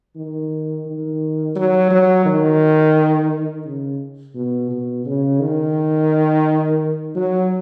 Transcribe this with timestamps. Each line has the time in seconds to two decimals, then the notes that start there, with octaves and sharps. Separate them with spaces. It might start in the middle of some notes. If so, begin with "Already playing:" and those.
0.16 D#3
0.86 D#3
1.56 F#3
1.91 F#3
2.26 D#3
3.66 C#3
4.35 B2
4.71 B2
5.06 C#3
5.40 D#3
7.15 F#3